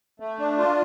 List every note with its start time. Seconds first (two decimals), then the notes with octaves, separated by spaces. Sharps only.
0.20 A3
0.39 D4
0.58 F4